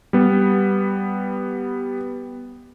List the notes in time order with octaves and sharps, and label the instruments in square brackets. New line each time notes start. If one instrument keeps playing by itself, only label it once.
[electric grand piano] G3 B3